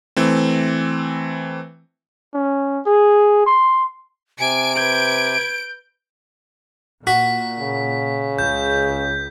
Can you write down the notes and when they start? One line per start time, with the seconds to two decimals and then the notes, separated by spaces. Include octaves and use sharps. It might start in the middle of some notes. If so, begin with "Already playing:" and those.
0.17 E3 A3 C4
2.34 C#4
2.86 G#4
3.47 C6
4.40 C3 G#5 D7
4.76 B4 G6 G#6
7.07 A#2 F#4 B6
7.60 C#3
8.39 C#2 G6